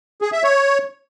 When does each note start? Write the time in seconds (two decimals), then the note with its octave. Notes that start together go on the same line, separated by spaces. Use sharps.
0.22 G#4
0.33 E5
0.43 C#5